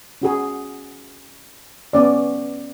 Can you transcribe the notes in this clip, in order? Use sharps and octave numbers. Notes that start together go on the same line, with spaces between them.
C#4 F#4 G#4
B3 C#4 D5